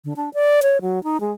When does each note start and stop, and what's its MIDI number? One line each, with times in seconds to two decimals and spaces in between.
0.04 0.13 50
0.16 0.30 62
0.34 0.60 74
0.62 0.81 73
0.82 1.02 54
1.04 1.20 63
1.21 1.33 56